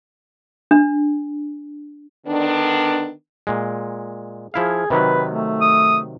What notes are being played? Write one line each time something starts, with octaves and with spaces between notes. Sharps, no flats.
D4
D3 D#3 B3 D4
A#2 G#3
F3 E4 G#4 F5
C3 D#3 F#3 B4
A3
D#6